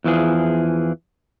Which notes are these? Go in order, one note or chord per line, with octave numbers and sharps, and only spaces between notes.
E2 E3 F3 G#4